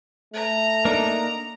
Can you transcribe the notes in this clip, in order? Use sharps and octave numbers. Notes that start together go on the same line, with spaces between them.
A3 A#5
A#3 D4 D#4